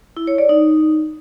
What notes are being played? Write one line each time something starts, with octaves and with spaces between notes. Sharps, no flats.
E4
C#5
D5
D#4